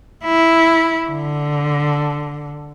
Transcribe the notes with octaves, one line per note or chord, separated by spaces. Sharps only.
E4
D3